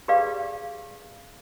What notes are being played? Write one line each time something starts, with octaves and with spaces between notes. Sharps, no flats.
G4 G#4 B4 D5 F5